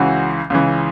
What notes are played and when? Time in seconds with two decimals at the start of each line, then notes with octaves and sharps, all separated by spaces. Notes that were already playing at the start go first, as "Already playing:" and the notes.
Already playing: C#2 C#3 E3 F#4
0.50 C#2 C#3 E3